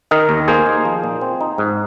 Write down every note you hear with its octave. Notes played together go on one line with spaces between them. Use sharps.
D#3 A#4 D#5
D#2
A#3 G#4 C5
D#4
F3
A#2
C4
D#4
G#2